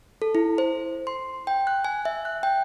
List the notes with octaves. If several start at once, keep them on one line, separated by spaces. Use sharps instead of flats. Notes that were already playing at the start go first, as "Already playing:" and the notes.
A4
E4
C5
C6
G5
F#6
G#5
E5
F#6
G5